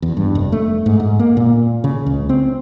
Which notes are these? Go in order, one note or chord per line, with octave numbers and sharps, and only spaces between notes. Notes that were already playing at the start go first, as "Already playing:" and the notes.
E2
G2
F1
A3
G#2
G#2
A#3
A#2
C#3
C#2
C4